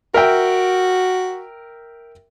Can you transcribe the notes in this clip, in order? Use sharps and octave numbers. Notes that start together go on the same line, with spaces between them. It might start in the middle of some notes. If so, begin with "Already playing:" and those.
F#4 A#4 E5 G5